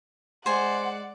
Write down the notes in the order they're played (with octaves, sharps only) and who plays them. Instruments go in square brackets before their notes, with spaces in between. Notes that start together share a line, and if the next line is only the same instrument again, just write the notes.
[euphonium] G#3 [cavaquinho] C5 G#5 [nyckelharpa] D5 [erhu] F#5